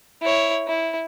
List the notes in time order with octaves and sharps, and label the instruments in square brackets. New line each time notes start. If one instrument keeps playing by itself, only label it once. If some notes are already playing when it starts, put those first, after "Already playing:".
[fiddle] E4 C#5
E4